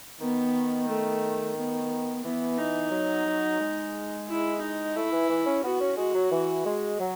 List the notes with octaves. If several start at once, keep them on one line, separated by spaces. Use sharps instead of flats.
D#3 B3
A3
B3
E3 B3
D#4
F#3
F#3
G#3
E4
D#4
A3 E4
E3
E3
C#4
B3 F#4
C#4
G#3 F#4
F#3
E3
G#3
F#3